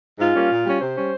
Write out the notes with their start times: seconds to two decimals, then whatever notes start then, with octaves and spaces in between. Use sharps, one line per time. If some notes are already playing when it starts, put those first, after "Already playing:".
0.19 G#2 F4
0.35 G3 A#3 C#4
0.51 A#2
0.65 G3 C#4
0.80 C3 C5
0.96 G3 C#4